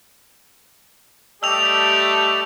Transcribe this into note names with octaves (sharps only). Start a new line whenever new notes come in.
G3 A3 G4 D5 D#5 A5 E6 F7